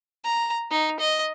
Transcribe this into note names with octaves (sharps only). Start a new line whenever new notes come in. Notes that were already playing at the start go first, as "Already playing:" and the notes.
A#5
D#4
D#5